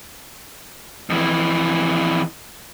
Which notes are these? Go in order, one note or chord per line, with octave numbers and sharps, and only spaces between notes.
F2 E3